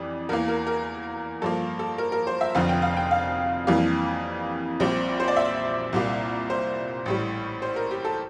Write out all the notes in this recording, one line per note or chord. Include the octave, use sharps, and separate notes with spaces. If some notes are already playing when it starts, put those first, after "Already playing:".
Already playing: F2 E3 G3 D5
E2 E3 A#3 A#4
A#4
A#4
G2 F3 A#3 A4
A4
A#4
A#4
C5
E5
F1 F2 D3 F3 F5
G5
F5
G5
F5
F2 E3 G3 A#3
A#1 A#2 G3 C4
C5
D5
E5
C2 A#2 G3 A#3
C5
A1 A2 G3
C5
A#4
G4
A4